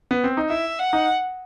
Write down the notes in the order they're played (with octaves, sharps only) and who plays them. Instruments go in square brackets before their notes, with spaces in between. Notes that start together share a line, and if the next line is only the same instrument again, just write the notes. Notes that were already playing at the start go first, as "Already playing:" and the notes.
[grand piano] B3
C4
D#4
[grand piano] E4 [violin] E5
[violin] F#5
[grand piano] D#4